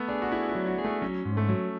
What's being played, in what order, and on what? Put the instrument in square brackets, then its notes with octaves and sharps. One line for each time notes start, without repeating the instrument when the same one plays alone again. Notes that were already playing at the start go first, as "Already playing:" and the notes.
Already playing: [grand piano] A3 B3
[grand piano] D4 [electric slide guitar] G#4
[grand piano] F#4
[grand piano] E4 [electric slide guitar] G#4
[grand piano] E4
[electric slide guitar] F#3
[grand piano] F#4
[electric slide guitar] G#4
[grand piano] A3
[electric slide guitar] F#3 [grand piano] C#4
[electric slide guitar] G#2
[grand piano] A3
[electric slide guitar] F#3